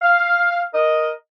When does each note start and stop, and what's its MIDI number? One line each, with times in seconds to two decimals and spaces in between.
0.02 0.63 77
0.74 1.11 70
0.74 1.11 75